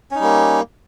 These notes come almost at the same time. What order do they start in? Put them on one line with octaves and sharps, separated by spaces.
C#4 D#4 G3 A#3